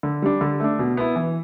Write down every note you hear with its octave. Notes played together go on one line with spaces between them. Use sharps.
D3
G3 D4
D3
A3 D4
B2
B3 E4
E3